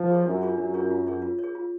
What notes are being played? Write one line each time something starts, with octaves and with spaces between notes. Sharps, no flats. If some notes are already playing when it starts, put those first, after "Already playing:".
Already playing: F3
F4 G#4 C#5
F#2 D4
F4 G#4 C#5
F#2 D4
F4 G#4 C#5
F4
G#4 C#5
F4
C#5
G#4
F4